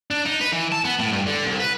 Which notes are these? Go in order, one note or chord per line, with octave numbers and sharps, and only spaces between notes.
D4
D#4
B4
E3
A5
B3
A2
G2
D3
C2
B4